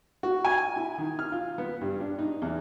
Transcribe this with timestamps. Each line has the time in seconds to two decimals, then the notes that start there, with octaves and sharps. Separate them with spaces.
0.23 F#4
0.45 G#5
0.76 E4
0.98 D#3
1.19 F6
1.32 F4
1.58 B3
1.81 G2
2.00 D4
2.19 D#4
2.42 E2